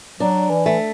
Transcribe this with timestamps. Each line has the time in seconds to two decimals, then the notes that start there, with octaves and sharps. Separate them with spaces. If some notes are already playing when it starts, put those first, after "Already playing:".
0.20 F#3 D4
0.50 E3
0.66 A3